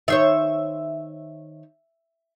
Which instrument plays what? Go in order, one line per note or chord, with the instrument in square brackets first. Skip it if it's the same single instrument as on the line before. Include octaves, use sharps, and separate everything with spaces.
[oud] D#3 C5 C#5 [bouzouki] E5